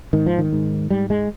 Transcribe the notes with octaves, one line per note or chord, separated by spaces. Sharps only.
G#2 D#3
F3
D#3
G#2
G#2 G3
G#3